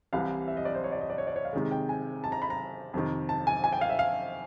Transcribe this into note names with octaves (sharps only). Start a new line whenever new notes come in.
C2 C3 E3 G3 F5
E5
D#5
D5
C5
C#5
D5
D#5
D5
C#5
D5
C#5
F5
C3 D#3 G#3
G5
G#5
A5
A#5
B5
A#5
F2 C3 D#3
A5
G#5
G#5
G5
F5
E5
F5